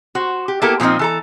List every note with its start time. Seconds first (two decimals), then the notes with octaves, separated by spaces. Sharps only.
0.15 F#4 C5
0.48 G4
0.62 A#3 B3 E4 G4 A4 A#4
0.80 A#2 F3 B3 C4 D#4
0.99 E3 A4 A#5